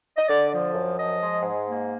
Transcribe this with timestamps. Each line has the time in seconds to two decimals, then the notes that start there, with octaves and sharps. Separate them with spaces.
0.17 D#5
0.29 D3 D5
0.51 F3
0.74 F#2
0.97 F3 D#5
1.20 G#3
1.42 G#2
1.65 A#3